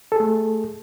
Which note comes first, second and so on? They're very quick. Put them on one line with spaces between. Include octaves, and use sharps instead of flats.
A4 G#4 A3